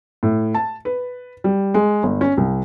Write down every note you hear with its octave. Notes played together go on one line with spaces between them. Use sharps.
A2
A5
B4
G3
G#3
G1
C#4
C2